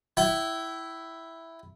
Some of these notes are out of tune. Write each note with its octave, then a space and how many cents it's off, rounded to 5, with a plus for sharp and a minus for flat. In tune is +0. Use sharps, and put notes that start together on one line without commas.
E4 +0 G5 -35